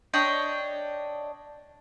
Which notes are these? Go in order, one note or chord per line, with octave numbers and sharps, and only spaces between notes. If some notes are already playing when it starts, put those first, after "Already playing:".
D4 C#5 D#5 G5